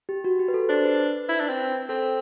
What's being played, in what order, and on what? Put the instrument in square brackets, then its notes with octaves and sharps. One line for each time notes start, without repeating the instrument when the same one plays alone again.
[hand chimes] G4
F#4
G4
B4
A4
[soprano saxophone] D4 [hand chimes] C5
[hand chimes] B4
B4
[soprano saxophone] E4
D4
C4
[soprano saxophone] C4 [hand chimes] A4